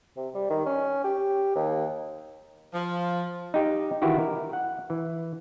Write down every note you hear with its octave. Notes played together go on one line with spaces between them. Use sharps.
C3
G3
D#3
C#4
G4
D#2
F3
D#4 G4
D#3 E3 E4 F#4 G4
A#4
F#5
E3